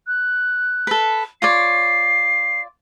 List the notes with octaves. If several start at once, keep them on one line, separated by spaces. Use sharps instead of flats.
F#6
A4 B4
F4 C#5 D5 C7